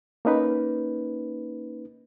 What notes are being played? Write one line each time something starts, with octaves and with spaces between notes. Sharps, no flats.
A#3 C#4 D#4 B4